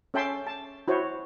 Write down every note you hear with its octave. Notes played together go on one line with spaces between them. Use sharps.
C#4 A4 E5 G5 A5 C6
A5
E4 F#4 C5 C#5